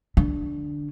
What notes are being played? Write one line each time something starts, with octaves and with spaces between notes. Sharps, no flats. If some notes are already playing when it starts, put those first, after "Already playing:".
D3